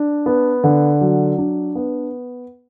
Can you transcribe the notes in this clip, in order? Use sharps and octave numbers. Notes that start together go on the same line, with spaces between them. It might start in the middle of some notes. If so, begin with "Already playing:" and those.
Already playing: D4
B3
D3
F#3
D4
B3